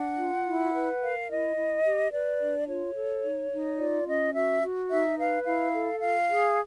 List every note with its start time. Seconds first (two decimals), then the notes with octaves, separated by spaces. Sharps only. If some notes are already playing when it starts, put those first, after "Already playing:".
Already playing: D4 F#5
0.18 F4
0.47 E4
0.73 B4
1.01 A#4 F5
1.30 E4 D#5
1.56 E4
1.84 G4
2.13 B4 D5
2.40 D4
2.68 F4 C#5
2.96 A4
3.23 D#4
3.51 D#4
3.78 F4 D5
4.06 C#4 D#5
4.34 F#4 E5
4.62 F#4
4.90 D#4 E5
5.18 B4 F5
5.45 E4 F5
5.73 A4
6.00 F4 F5
6.28 G#4